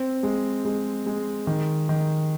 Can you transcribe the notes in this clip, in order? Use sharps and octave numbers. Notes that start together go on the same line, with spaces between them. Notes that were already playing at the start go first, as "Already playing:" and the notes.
Already playing: C4
G#3
G#3
G#3
D#3
D#3